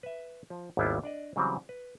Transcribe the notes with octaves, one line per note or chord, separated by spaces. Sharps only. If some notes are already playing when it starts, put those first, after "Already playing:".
B4 E5
F3
G#1 D#2 G3 B3 E4 F4
D4 D5 D#5
C#3 E3 F#3 G3 C4
B4